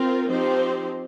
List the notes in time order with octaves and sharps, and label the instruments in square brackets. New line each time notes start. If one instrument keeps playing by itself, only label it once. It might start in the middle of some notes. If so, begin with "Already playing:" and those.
Already playing: [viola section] C4 F4 A#4
F3 C4 D#4 G4 C5